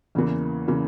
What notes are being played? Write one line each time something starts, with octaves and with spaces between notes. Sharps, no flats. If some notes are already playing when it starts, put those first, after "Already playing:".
E2 C#3 E3 A#3
C#3 E3 A#3